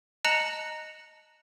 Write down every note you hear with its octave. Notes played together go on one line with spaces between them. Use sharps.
D#5 A5 A#5 F#6 C#7 F#7